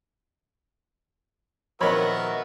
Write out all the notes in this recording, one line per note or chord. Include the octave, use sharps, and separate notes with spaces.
A#1 D#3 B3 F#4 A#4 C#5 E5 B5